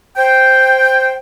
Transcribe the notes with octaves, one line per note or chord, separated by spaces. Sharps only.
C5 G5